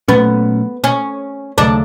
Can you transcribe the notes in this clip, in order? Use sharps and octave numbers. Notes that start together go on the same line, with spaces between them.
A#2 F#3 A3 B3 C#4
C#4
D#2 C#3 F#3 A3 D4